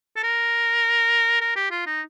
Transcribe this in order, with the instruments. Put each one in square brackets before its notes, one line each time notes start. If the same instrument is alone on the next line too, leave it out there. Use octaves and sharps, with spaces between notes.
[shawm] A4
A#4
A#4
G4
F4
D#4